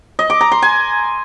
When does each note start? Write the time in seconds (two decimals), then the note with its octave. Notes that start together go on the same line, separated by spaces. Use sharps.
0.19 D#5
0.30 D6
0.41 A#5
0.52 C6
0.62 G#5